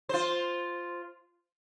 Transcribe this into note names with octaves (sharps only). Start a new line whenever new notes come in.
F4 C5